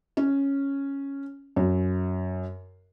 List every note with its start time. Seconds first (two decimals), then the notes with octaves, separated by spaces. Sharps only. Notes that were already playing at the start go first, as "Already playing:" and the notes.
0.17 C#4
1.56 F#2